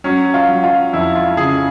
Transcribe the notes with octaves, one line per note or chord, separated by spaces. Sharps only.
F#3 C#4
F4
F#3
F4
F2 E4
F4
C#3 G#4